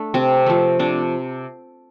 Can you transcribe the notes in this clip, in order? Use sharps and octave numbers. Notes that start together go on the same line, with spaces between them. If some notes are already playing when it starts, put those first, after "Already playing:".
Already playing: A3 D4
C3 C4
F3 A3
C3 D4